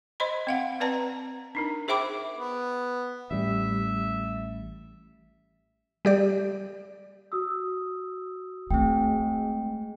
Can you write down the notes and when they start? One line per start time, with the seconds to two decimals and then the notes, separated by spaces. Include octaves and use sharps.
0.20 C5 D#5 B5 C6
0.47 C4 F5 F#5
0.80 C4 B4 D5 A5 A#5
1.55 D4 D#4 A#4
1.88 G#4 C5 E5 G5 B5 D6
2.37 B3
3.31 A1 G3 E5
6.05 G3 G4 D5
7.32 F#4 D#6 E6
8.71 G#3 A3 C4 G5